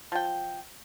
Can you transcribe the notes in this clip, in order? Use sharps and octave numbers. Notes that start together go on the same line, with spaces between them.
F3 G5